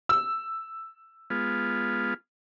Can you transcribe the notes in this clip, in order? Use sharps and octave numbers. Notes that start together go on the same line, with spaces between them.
E6
G#3 B3 F4